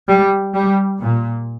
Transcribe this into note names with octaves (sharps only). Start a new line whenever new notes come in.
G3
G3
A#2